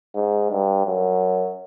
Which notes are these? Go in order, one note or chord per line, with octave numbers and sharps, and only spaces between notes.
G#2
G2
F#2